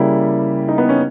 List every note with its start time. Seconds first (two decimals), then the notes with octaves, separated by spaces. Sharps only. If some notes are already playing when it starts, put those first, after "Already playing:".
Already playing: C#3 G3 A#3 E4
0.69 D#4
0.78 B3
0.89 C#4